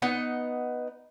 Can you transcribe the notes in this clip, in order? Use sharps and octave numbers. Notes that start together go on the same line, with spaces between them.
B3 D#4 F#5